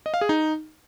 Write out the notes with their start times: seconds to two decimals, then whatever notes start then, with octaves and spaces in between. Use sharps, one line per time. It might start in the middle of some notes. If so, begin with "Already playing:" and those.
0.06 D#5
0.14 F5
0.21 G#4
0.29 D#4